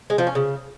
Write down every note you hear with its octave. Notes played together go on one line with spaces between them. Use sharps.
G#3
F3
C#4
C#3